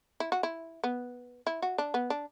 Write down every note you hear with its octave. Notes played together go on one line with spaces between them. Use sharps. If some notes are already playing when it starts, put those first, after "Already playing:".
E4
F#4
E4
B3
E4
F#4
D4
B3
D4